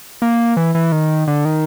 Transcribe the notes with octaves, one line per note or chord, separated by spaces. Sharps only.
A#3
E3
E3
D#3
D3
D#3